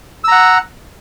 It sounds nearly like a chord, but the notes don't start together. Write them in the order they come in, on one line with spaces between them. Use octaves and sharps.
E6 A#5 F#5